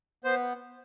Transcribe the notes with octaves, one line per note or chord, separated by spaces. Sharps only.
B3 C5